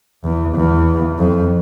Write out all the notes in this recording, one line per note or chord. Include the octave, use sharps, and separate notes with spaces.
E2
E2
F2